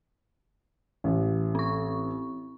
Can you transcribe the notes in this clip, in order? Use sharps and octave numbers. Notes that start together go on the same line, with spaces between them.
A1
C4 C#6